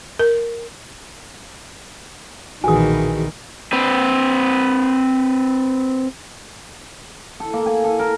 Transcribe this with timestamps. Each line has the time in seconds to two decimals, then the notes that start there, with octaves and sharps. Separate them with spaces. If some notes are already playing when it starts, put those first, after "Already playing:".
0.19 A#4
2.64 B1 A#2 D#3 E3 F#4 G#4 G#5 D#6
3.73 C4 B4
7.40 A4
7.53 A#3
7.66 G#5
7.84 A4
7.99 A#4